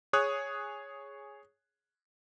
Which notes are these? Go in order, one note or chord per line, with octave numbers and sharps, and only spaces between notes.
G#4 C#5 D#6 F#6